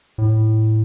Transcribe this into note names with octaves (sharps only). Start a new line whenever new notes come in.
A2